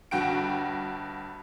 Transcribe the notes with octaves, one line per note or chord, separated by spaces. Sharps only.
G1 G2 F#4 G5 D7